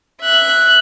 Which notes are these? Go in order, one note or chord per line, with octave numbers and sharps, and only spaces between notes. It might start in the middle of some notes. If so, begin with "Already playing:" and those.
E5 F#6